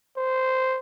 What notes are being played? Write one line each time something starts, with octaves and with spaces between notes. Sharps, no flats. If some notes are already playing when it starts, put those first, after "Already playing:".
C5